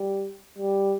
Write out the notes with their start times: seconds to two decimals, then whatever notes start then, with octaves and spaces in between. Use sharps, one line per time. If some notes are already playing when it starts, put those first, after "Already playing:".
Already playing: G3
0.58 G3